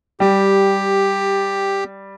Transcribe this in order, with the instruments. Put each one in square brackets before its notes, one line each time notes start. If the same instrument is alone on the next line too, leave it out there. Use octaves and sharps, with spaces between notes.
[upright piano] G3 [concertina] G4